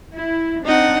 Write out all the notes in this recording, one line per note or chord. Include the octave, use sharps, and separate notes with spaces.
E4
C4 D4 D#4 F#5